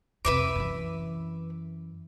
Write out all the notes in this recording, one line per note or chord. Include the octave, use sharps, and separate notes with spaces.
F2 C3 B4 E5 D6
F#2 E3